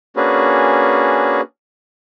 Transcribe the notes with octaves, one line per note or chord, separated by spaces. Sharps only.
A#3 C#4 D4 F#4 G#4 B4